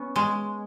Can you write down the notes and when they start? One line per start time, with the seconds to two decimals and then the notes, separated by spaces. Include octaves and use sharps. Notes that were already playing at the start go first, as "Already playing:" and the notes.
Already playing: B3 C#4
0.16 G#3